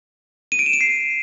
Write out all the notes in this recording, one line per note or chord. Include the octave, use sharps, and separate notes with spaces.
D#7
D7
E7
D#7
C7